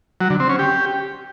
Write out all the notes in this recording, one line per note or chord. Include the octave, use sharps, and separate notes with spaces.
F#3
D3
C4
C#4
G4